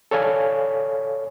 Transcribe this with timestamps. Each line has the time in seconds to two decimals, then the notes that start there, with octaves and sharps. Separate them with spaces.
0.11 A4 C#5 D5 F5 G#5